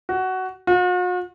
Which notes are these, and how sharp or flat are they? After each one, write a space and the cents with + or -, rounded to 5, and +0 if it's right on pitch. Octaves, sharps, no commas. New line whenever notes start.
F#4 +15
F#4 -45